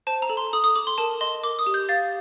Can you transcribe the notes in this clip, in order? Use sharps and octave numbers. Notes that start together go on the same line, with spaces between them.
C5 A5
A#5
A4
C6
A4 D#6
D#6
A4 D6
C6
A#4 A5
D#5 C6
A#4 D6
D#6
G4
G6
F5 A6